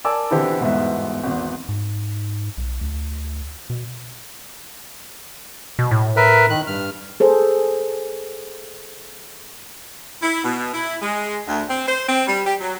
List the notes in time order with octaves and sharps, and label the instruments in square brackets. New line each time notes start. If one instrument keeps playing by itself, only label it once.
[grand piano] A#4 D5 G#5 A5 D6 E6
B2 D3 E3 C4 G4
G1 E2 G#2 B2 E5
G#1 E2
[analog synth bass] G#2
B1
D2
B2
[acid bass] B2
A2
[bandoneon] A#4 B4 E5
D#3 F#6
G2 F6
[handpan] G#4 A4 C5
[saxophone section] E4
B2
E4
G#3
D2
C4
C5
C4
G3
G4
F#3